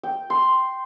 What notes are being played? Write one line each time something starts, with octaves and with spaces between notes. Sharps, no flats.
G5
C6